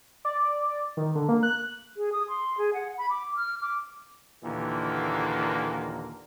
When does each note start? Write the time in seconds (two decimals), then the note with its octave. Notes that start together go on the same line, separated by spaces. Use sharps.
0.25 D5
0.97 D#3
1.15 D3
1.29 A#3
1.43 F#6
1.97 G#4
2.12 D#6
2.29 C6
2.58 G#4
2.74 F#5
2.98 B5
3.10 D6
3.36 F6
3.61 D6
4.43 D#2 A#2 D3 E3 A#3